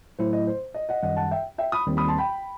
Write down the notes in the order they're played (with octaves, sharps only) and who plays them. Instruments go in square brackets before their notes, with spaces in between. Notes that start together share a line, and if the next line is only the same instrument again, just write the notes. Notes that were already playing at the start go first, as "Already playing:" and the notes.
[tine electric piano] A2 F#3 A3 E4 [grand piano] C5
[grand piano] D#5
C5
D#5
D#5 F#5
[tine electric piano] F#2 D#3 G3 [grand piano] D#5 F#5
[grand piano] F#5 A5
E5 G5
E5 G5
B5 D#6
[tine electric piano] D#2 D#3 G3 C4
[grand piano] B5 D#6
A5 C6
G5 B5